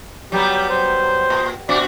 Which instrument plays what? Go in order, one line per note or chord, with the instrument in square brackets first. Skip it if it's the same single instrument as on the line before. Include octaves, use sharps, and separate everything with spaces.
[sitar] F#3 G3 B3 [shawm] G4
[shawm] C5
[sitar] A#2
[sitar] B2 D4 F#4 [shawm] D5